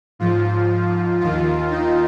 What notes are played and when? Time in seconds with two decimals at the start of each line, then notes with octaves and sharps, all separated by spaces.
0.19 G#2 F3 F4
1.21 D#2 D#3 F4
1.71 D#4